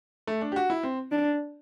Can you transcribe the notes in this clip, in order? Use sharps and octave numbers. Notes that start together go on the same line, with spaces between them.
A3
D4
G4
F#4
E4
C4
D4